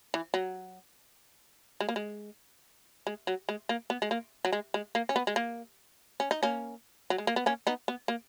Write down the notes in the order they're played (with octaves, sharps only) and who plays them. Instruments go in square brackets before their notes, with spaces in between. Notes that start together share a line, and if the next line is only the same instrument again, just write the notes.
[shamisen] E3
F#3
G#3
A#3
G#3
G#3
F#3
G#3
A#3
B3
G#3
A#3
F#3
G#3
G#3
A#3
C#4
B3
G#3
A#3
C#4
D#4
A#3 C#4
F#3
G#3
A#3
B3
A#3 C#4
B3 D#4
B3
A#3